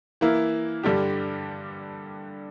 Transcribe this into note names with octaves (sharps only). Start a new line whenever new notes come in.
E3 A#3 E4
G2 D3 G3 D4 G4